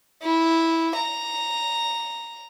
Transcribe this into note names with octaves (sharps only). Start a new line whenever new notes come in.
E4
A#5